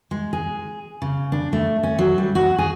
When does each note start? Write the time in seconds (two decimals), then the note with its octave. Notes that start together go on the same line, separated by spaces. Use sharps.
0.11 G#3
0.33 G#4
1.02 C#3
1.32 D4
1.53 A3
1.83 C#4
1.99 F#3
2.18 G3
2.35 F#4
2.58 G#4